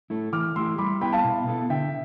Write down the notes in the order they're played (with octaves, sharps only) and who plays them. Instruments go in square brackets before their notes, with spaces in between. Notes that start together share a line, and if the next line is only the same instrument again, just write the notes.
[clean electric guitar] A3 E4 A4
[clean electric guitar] E3 [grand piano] D6 F6
[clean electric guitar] A3 E4 G4 [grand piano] C6 E6
[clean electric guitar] G3 [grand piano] B5 D6
[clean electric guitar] B3 E4 [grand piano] G5 B5
[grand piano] F5 A5
[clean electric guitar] B2
B3 E4 A4
[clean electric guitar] D3 [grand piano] E5 G5